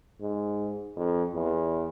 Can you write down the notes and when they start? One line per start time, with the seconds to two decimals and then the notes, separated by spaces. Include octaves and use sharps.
0.21 G#2
0.96 F2
1.34 E2